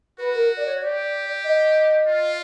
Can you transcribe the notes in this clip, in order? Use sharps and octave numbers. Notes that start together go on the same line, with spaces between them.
F#4 B4
A#4
D5
C#5
G4 D5
D#5
F4